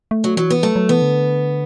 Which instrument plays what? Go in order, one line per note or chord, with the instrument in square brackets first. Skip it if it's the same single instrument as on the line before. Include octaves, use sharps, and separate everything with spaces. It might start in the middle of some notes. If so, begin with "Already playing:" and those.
[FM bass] A3
[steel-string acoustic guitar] F#3
[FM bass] E3 [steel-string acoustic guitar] F#3
[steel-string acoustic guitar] B3
[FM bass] F#3 [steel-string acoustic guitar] A3
[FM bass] F#3
[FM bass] E3 [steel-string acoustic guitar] B3
[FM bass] D3